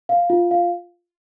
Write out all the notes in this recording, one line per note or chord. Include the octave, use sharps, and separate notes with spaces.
F5
F4
F5